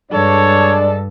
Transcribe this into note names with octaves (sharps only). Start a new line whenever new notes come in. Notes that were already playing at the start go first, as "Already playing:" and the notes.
G2 G#3 D4 A4 C#5 D5